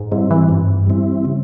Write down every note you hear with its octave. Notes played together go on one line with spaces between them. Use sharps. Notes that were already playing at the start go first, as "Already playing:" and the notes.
Already playing: G#2
G#2 G3 C4 E4
E3
G2
G3 C4 E4
C#3